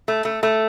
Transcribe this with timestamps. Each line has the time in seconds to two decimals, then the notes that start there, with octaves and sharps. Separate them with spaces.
0.08 A3
0.25 A3
0.43 A3